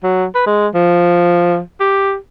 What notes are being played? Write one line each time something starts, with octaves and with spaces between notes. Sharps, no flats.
F#3
B4
G#3
F3
G4